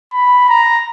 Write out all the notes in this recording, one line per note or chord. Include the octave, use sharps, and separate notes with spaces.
B5
A#5